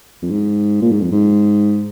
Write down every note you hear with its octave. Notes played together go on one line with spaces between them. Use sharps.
F2
G#2
A#2
G#2
F2
G#2